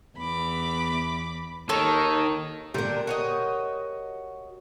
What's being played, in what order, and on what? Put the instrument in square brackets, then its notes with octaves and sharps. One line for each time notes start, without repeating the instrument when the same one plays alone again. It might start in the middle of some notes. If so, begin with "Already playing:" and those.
[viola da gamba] E2 [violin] B5 D6
[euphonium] D#2 [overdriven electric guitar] D#3 [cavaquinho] A4 C#5
[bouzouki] A#2 D3 D4 [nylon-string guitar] G4 A#4
[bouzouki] F#4 C#5 D#5